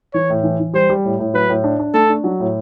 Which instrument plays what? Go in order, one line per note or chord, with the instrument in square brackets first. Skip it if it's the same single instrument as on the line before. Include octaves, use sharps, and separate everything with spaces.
[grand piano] E3 [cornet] C#5
[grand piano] A2
E3
E3
[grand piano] G3 [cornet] C5
[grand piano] G3
A2
A2
[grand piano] F#3 [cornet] B4
[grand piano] A2
D4
D4
[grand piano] A3 [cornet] A4
[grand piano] D4
F#3
A2